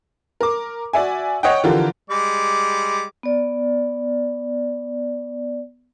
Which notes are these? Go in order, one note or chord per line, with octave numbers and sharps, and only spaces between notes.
A#4 D6
F#4 D5 E5 G#5
C#5 D#5 F#5 G5
D3 E3 F3 F4 G4 A#4
G3 G#3 D6
B3 D5